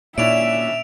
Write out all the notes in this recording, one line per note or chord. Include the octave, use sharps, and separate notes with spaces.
A#2 C#4 D4 E4 E5 D7 F7